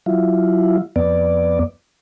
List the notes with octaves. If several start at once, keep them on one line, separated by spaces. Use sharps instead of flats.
F#3 E4 F4
F2 B3 D5